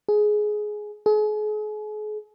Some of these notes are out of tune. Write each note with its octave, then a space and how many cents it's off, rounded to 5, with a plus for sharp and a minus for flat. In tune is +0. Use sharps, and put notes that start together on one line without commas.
G#4 +15
G#4 +40